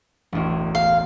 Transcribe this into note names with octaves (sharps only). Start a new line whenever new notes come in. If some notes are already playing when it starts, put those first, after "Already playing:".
E1 A1
F5